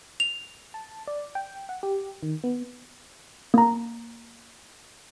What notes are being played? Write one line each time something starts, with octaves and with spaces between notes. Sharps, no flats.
F7
A5
D5
G5
F#5
G4
D#3
B3
A#3 A#5